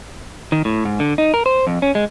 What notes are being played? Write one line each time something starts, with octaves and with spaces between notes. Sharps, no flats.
D#3
A2
G#2
D3
D#4
A#4
C5
F2
C#4
G#3